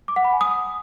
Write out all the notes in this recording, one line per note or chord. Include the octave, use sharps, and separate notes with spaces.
D6
F#5
B5
G#5
D#6